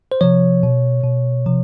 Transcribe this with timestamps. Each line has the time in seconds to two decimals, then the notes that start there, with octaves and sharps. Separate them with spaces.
0.12 C5
0.21 C3 F3 C#5
0.63 B2
1.04 B2
1.46 C3 F3